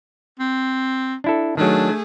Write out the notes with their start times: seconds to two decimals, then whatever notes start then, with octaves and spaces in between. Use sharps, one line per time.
0.39 C4
1.24 D4 E4 A4
1.57 D#3 F#3 A3 D4 G#4